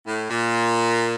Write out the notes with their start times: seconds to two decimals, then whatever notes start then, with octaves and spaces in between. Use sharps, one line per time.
0.07 A2
0.30 A#2